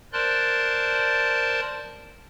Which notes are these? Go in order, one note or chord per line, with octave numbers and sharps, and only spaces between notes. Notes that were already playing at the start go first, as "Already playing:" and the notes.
A#4 C5 D5 A5 C6 F#6